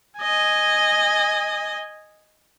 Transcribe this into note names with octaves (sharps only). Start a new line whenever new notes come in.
D#5 G#5